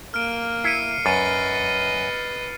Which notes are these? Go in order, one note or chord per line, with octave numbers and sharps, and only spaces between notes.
A#3 F6 D7
E4 C7 C#7 D#7
F#2 B4 D#5 A6 C7 D#7